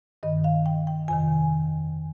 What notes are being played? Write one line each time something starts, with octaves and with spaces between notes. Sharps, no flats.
G2 D#3 D#5
F5
G5
G5
F2 C3 D#3 G#5